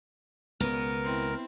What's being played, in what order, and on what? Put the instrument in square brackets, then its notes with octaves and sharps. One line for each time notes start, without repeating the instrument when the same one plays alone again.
[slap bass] C#2 B2 [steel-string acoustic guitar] B3 [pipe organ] A#4
[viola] C4 E4